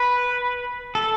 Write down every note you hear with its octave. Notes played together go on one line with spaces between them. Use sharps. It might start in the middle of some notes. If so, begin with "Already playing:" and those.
Already playing: B4
A4